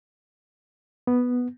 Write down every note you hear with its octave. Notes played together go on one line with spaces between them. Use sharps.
B3